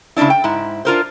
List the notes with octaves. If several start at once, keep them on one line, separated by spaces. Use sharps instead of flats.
C#3 A3 C#4 D4 E4
G5
G#2 E4
D4 F4 A#4 C5